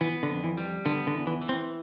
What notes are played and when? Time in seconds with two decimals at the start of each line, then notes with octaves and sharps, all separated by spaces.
0.01 E3 B3
0.23 D3
0.30 F2
0.44 E3
0.57 G3
0.85 D3 B3
1.07 D3
1.14 E2
1.27 E3
1.42 E3
1.49 C4